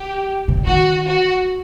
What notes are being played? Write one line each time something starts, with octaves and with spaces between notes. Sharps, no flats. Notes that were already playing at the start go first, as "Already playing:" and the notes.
Already playing: G4
C3
D3
D#3 F#4
F#4